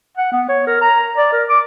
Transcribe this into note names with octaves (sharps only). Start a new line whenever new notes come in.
F#5
B3
C#5
A#4
A#5
D5
A#4
D6